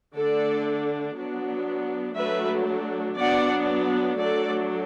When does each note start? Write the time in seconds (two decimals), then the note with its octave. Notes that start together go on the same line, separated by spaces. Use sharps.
0.15 D3 A3 D4 A4 D5
1.17 F#3 B3 D4
2.18 F#3 A3 D4 B4 E5
3.18 F#3 B3 D4 D5 F#5
4.18 F#3 A3 D4 A4 D5